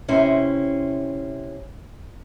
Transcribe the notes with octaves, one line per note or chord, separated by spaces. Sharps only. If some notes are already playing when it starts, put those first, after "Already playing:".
C3 C#4 E4 C5